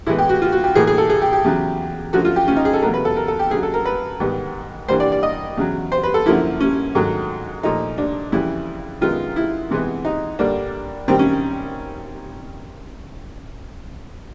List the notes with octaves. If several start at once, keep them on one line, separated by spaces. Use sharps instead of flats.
A2 E3 G#3 B3 E4
G4
F#4
F4
F#4
G4
A2 E3 G3 A#3 G#4
G#4
A4
G#4
G4
G4
E2 C#3 F#3
F#2 D3 F3 A3 F#4
F4
G4
C#4
D#4
G#4
A4
E2 B2 F#3 A3 A#4
B4
A4
A#4
A4
G4
F#2 D3 F#3 G#4
A4
A#4
B4
G#2 D#3 G3 B3
G2 E3 G3 A#3 C5
D5
D5
D#5
E2 C#3 F#3
C5
B4
A4
F#2 D3 F3 A#3 E4
C#4
G#2 D#3 F#3 A3
A#2 F3 A3 D#4
D4
F2 C#3 E3 G3 E4
F#2 D#3 G#3 B3 F4
E4
C3 E3 G#3 B3
D#4
G2 D3 G3 A#3 D4
F#2 D#3 G3 C4
C#4